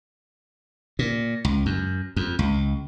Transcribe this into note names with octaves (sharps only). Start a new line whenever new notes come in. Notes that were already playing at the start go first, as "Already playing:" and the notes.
A#2
C#2
F#2
F2
C#2